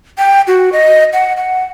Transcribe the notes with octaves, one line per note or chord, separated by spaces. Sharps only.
G5
F#4
D#5
F#5
F#5